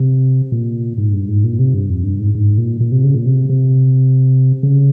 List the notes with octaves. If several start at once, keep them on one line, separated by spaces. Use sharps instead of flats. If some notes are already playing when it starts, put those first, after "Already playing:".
Already playing: C3
A#2
G#2
G2
G#2
A#2
C3
G2
F2
G2
G#2
G#2
A#2
A#2
C3
C#3
A#2
C3
C3
C#3